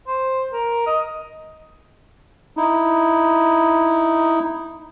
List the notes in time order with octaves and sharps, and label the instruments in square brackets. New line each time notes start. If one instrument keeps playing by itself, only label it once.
[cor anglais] C5
A#4
D#5
[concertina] D#4 E4